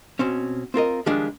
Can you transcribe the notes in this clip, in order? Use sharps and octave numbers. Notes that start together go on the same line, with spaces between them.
B2 C4 C#4
C4 F4 A#4 D#5
D#3 F3 G3 G#3 D4